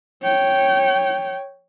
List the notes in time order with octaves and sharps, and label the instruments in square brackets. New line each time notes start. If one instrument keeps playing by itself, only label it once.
[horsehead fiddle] C#5 G5